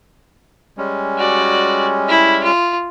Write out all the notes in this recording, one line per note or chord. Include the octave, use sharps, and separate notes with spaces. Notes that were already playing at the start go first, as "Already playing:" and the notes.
G3 G#3 C#4
F#4 D5
E4
F4